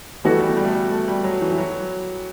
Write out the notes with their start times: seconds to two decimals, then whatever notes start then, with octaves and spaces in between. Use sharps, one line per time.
0.24 E3 G3 B3 F#4 A4
0.32 A3
0.40 G3
0.49 A3
0.57 G3
0.65 A3
0.72 G3
0.91 A3
1.08 G3
1.24 F#3
1.41 E3
1.52 E3
1.58 F#3